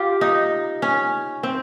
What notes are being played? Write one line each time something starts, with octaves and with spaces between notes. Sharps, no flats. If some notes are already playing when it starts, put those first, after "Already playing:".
Already playing: F4 G4
D#4
C#4
C4